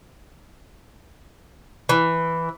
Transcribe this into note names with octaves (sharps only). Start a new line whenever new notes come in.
E3